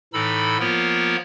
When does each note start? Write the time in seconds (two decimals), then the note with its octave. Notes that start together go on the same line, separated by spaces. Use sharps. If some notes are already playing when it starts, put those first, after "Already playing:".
0.14 A2 E3 D#4 A4 B5 E6
0.60 F3 A#3 B3 F4 A#4 C#5